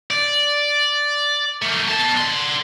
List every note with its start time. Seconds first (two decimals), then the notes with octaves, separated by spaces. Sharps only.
0.10 D5
1.62 A3 A#3
1.88 B2 A5
2.15 D3 C6